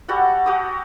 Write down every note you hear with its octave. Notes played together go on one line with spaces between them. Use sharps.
G3 F#4 A4 F#5
F#4 G4 A5 D#6